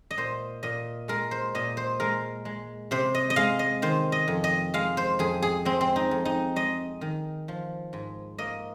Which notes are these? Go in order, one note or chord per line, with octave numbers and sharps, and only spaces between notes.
D#5
A#2 C5
A#2 D#5
G#3 A#4
C5
A#2 D#5
C5
G#3 A#4
G#3
C3 C5
D#5
D#5
G#3 F5
D#5
D#3 C5
D#5
F2
D#5
G#3 F5
C5
F2 G#4
G#4
G#3 C4
C4
D#4
F2
D#4
G#3 D#5
D#3
F3
G#2
A#3 D#5